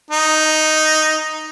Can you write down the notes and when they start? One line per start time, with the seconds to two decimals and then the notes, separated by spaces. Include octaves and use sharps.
0.11 D#4